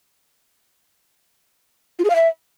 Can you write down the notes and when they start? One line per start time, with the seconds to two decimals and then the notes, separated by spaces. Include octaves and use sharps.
1.99 F4
2.05 G#4
2.10 F5
2.15 E5